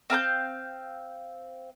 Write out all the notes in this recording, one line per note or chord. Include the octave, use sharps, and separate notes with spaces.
C4 F5 A5 G6